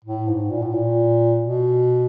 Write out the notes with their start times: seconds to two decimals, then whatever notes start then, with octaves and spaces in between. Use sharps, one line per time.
0.05 A2
0.28 G#2
0.50 A#2
0.62 A2
0.74 A#2
1.40 B2